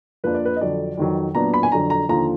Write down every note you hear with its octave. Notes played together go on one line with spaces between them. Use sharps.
F2 F3 A#3 D4 B4
D5
B4
D#5
F2 D3 F#3 D4 D5
F2 D#3 F#3
A#2 F#3 B3 D4 A#5
B5
G#5
F2 D3 F#3 D4 A#5
A#5
D#2 D3 F3 A#5